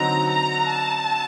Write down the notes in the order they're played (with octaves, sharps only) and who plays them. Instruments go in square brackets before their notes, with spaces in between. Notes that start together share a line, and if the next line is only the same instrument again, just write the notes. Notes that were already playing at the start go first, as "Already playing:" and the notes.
Already playing: [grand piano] D3 F#3 C4 D#4 [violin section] A#5
[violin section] A#5
A5